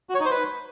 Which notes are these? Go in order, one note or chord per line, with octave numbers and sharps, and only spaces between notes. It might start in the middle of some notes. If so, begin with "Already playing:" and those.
F#4
C#5
D#4
C5
B4